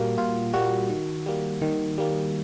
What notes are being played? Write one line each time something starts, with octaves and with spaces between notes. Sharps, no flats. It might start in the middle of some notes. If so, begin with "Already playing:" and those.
Already playing: A#2 G3 A#3 F#4
A#2 F4
G3 A#3 F#4
D#3
G3 A#3
D#3
G3 A#3